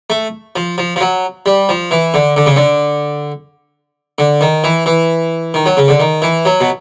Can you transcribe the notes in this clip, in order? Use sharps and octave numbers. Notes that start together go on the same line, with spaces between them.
A3
F3
F3
F3
F#3
G3
F3
E3
D3
D3
C#3
D3
D3
D#3
E3
E3
D#3
F#3
C#3
D3
D#3
E3
F#3
B2